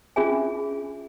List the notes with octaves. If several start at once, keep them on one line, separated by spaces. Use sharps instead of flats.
C#4 D4 F4 G#4 E5 G#5